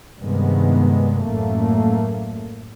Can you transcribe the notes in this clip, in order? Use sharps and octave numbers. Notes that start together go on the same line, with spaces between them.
G2 C3 D#3 G#3 B3
A1 F#2 A3 A#3